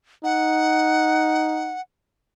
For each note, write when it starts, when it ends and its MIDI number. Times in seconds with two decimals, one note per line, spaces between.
0.24 1.76 63
0.24 1.81 78